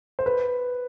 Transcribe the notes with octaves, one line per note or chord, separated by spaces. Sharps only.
C5
B4